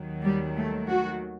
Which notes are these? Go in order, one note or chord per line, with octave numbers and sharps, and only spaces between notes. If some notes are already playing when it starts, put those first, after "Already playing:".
Already playing: D#2 D#3 F#3
G3
A3
F#4